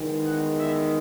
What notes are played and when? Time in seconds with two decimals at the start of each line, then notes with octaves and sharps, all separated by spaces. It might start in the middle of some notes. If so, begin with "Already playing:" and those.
Already playing: E2 D#3 G#3 B3
0.25 F#5
0.59 E5